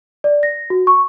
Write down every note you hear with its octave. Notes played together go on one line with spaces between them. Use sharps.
D5
A#6
F#4
C#6